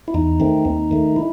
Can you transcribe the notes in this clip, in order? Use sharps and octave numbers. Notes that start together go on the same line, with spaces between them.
E4
E2 D#4
D#3 A3 C4
D#2
D#3 A3
E4